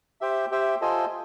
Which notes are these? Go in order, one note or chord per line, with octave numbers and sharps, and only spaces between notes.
G4 C5 E5 G5
G4 C5 E5 G5
F4 A4 C5 D#5 G#5